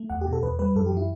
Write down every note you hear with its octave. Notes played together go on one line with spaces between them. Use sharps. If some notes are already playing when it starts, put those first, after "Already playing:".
Already playing: A3
E2 F#5
G4
B2
A4
E2 B4
G3 B4
F#2 A4
G4
E3
E4